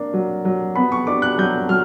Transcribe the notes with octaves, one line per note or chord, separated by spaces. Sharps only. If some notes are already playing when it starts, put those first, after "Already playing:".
Already playing: A#3 D4
F#3
F#3
B3 B5
C#6
D4 D6
F#6
F#3 G6
F#3 F6